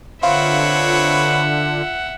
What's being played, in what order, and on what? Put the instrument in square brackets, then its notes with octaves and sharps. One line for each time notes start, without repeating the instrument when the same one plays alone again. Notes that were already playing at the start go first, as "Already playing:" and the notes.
[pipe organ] D3 [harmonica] C4 B4 C#5 [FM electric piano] F4 [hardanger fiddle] E5 F#5